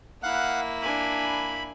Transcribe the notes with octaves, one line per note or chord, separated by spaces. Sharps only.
A#3 E4 F5 F#5 F#6
D4 G#5 B5